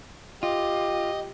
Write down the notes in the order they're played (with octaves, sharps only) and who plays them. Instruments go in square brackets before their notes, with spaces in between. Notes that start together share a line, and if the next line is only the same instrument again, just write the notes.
[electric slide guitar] F4 [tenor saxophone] G4 [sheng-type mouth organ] D#5